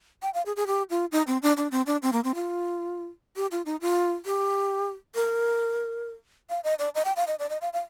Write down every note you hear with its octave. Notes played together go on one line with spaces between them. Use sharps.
G5
F5
G#4
G#4
G4
F4
D#4
C4
D4
D4
C4
D4
C4
A#3
C4
F4
G4
F4
D#4
F4
G4
A#4
F5
D#5
D5
D#5
G5
F5
D#5
D5
D#5
F5
F5